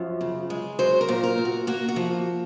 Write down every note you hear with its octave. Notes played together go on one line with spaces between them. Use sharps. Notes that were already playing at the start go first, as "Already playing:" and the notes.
Already playing: F#2 F3
C#3
G#3
F#3 C5
A#4
A#2
A#4
A#2
F#4
A#3 F#4
F#4
F3